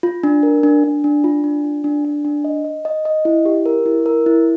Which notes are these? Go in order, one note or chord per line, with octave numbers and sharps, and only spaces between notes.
F4
D4
A#4
D4
D4
D4
F4
D4
F4
D4
D4
D4
D#5
D#5
D#5
D#5
E4
G4
A#4
E4
A#4
E4